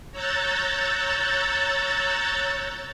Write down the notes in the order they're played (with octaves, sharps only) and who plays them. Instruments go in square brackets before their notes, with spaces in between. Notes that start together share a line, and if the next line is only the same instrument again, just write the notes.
[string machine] C#5 A#5 E6 F#6 G6 A6